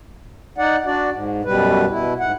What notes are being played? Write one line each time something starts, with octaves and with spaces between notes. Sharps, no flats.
D#4 D5 F#5
D4 F#4 D5
G#2
F#2 B2 G3 B4
B2 E4
G#2 F#5